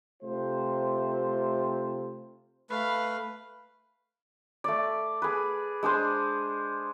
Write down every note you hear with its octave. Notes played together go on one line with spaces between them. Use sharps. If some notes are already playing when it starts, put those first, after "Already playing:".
C3 A3 F4 C5
A3 B4 F5 B5
A3 D5
G#4 B4
G#3 D4 G#4 C5